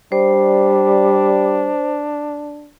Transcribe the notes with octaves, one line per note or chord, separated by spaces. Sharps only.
G3 D4 C5